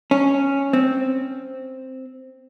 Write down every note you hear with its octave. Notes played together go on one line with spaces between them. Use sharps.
C#4
C4